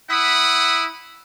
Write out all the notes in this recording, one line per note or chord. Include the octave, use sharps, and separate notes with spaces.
E4 E5 F#5 B5 D#6